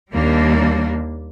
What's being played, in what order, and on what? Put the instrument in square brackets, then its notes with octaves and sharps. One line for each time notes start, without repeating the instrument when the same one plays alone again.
[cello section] D#2 G3 A#3 D4